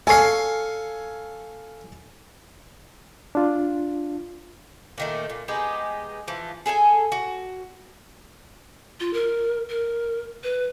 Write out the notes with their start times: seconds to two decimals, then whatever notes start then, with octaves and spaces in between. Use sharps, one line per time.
0.07 A4 C#5 F5 G#5 C7
3.35 D4 F4
4.98 A#2 D#3 A3
5.30 A#2
5.48 G#3 B3 D#4 G4
6.28 E3 F3
6.66 G#4 A4 F5 G#5
7.12 F#4
9.00 F4
9.13 A#4
9.69 A#4
10.44 B4